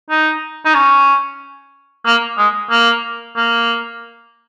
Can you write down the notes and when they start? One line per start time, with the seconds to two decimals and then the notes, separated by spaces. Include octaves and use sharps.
0.10 D#4
0.65 D#4
0.75 C#4
2.06 A#3
2.38 G#3
2.71 A#3
3.36 A#3